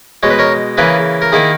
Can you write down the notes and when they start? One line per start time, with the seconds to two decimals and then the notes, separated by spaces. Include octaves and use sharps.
0.23 B2 G#3 C#5
0.30 B4
0.39 A#4 C#5
0.77 C#3 E3 A#3 G#4 B4
1.22 A#4
1.32 D#3 A#3 E4 G#4